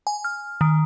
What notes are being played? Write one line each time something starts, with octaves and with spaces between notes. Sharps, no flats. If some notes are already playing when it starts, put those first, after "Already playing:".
G#5
F6
D#3